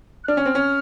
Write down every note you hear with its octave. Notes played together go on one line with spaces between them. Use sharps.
F#6
D4 F6
C#4
C4
C#4